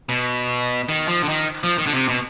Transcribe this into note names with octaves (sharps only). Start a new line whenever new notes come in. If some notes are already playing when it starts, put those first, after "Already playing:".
B2
D#3
F3
D3
D#3
F3
D#3
D3
C3
B2